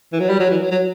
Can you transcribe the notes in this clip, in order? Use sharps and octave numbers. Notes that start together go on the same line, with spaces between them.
E3
F#3
G3
F#3
E3
F#3
F#3